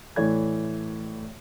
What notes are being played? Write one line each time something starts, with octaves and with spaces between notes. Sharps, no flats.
A2 E3 A3 C#5 D5 G#6